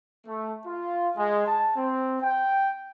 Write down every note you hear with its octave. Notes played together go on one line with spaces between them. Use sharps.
A3
F4
G#3
A5
C4
G5